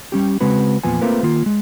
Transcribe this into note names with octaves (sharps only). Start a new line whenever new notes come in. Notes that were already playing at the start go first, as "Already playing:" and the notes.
G3 C#4 G4
C#3 G#3 C4 F#4 B4
E2 A#2 F3 B3 G#5
A3 A#3 C4 F4 A#4 B4
D#3 A#3 F4
G#3